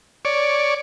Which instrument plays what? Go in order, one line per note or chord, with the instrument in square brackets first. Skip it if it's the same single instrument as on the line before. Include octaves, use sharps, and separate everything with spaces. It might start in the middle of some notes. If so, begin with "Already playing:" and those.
[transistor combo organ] C#5 D5